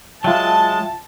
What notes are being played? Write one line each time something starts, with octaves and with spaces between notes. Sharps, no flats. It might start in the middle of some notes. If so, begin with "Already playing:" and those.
F#3 G#3 F4 E5 G5 A5